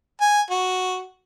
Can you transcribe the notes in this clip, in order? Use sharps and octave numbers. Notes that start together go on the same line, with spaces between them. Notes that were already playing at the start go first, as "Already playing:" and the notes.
G#5
F#4